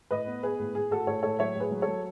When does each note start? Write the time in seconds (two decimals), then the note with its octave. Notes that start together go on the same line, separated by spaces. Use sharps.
0.11 A2 B4 D#5
0.27 B3
0.43 B3 G#4 B4
0.59 A2
0.75 A2 G#4
0.91 A2 F#4 A4
1.07 A2 A4 C#5
1.23 A2 A4 C#5
1.39 F#3 C#5 E5
1.55 A2
1.60 G#4 B4
1.71 F#3
1.82 F#3 A4 C#5